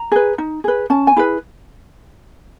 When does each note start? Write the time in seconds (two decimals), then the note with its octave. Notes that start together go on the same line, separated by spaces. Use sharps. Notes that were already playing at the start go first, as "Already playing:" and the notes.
Already playing: A#5
0.12 G#4 B4
0.38 D#4
0.64 G#4 B4
0.90 C#4 A5
1.07 G#5
1.17 E4 G#4 B4